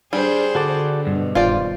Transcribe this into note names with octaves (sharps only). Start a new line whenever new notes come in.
G3 D4 G#4 C5
D3 F#4 A4 D5
G2 B2
D#1 F4 C5 D5